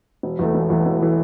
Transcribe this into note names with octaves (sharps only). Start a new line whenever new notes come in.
E1
E2 E3 A3
E1
E2 E3 A3
E1
E3 A3